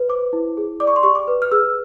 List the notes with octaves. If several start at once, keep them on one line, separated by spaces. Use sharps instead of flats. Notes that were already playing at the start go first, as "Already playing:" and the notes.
Already playing: B4
C5 D6
E4
G#4
D5 D6
C#6
C6
G4 C#6
D6
B4
F6
G#4 E6